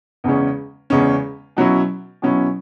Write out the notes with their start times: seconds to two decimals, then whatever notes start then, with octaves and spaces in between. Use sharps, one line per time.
0.24 E2 C#3 G#3 C#4
0.90 E2 C#3 G#3 C#4
1.57 B2 F#3 C#4 E4
2.22 B2 F#3 C#4 E4